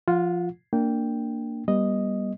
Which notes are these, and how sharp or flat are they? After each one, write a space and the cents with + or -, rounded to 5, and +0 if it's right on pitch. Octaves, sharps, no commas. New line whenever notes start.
F3 -5 F4 +0 F#5 -30
A#3 -15 D4 +0 G5 +0
G3 +0 B3 -35 D#5 +0